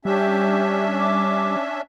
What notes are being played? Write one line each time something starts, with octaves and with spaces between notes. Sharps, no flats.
G3 C#4 D4 G4 E5
D6